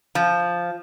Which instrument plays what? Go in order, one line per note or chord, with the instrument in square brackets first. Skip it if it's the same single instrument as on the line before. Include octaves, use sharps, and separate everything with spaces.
[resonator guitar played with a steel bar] F3